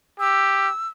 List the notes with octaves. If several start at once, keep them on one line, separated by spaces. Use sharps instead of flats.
G4 E6